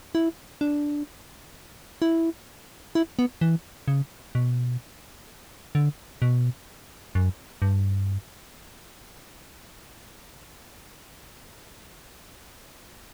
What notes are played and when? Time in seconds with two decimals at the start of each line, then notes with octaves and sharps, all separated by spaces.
0.15 E4
0.61 D4
2.02 E4
2.95 E4
3.19 B3
3.41 E3
3.88 C#3
4.35 B2
5.75 D3
6.22 B2
7.15 F#2
7.62 G2